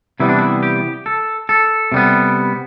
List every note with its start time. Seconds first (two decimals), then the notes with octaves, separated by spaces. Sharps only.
0.20 C3 E3 G3 B3 E4
0.29 D4
0.39 E4
0.63 G4
1.06 A4
1.49 A4
1.92 C3 G3 B3